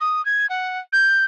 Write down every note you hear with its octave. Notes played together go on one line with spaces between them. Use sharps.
D#6
G#6
F#5
G6